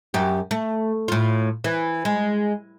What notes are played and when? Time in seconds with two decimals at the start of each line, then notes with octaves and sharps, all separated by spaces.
0.14 F#2 G4
0.51 A3
1.08 A2 F4
1.64 E3
2.05 G#3